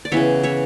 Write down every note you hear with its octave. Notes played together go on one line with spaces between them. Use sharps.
D5
C#3 E3 B3 C#5 E5
C#5 E5